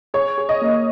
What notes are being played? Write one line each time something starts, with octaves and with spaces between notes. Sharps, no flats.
G#4 C#5
G#4
D#5
A#3